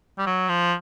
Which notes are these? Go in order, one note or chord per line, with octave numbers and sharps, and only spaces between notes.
G3
F#3
F3